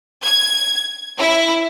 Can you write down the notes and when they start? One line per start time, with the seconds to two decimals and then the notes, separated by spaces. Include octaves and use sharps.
0.25 G#6
1.18 E4